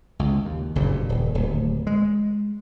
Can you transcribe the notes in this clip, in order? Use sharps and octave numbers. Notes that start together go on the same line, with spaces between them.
C#2
D#2
F#1 G2 A#2
D#1
D1 D#2
G#3